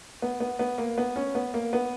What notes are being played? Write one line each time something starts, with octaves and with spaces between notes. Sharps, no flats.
B3
B3
B3
A#3
B3
C#4
B3
A#3
B3